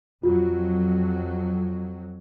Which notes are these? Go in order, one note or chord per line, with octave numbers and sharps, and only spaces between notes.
F2 F#3 F4 F#4